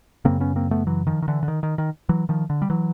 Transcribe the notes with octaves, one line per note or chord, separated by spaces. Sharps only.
F#2 C#3 A#3 C4
B3 C#4
A#3 C4
A3 B3
E3 F#3
D#3 F3
D#3
D3 E3
D3
D#3
D#3
D#3
E3 F#3
D#3 F3
D3
G3
E3 F#3